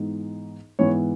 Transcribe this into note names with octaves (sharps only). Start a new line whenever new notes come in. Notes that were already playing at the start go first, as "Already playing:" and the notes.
Already playing: G#2 E3 B3 D#4
G#2 E3 B3 C#5